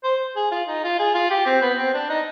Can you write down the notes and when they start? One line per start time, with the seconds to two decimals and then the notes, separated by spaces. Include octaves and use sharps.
0.04 C5
0.36 G#4
0.51 F4
0.68 D#4
0.84 F4
0.99 G#4
1.15 F4
1.30 G4
1.46 C4
1.62 B3
1.78 C4
1.94 D4
2.10 D#4